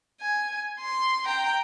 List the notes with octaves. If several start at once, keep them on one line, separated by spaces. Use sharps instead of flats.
G#5
C6
G5 A#5